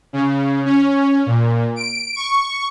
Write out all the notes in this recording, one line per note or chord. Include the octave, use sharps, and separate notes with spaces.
C#3
C#4
A#2
D7
C#6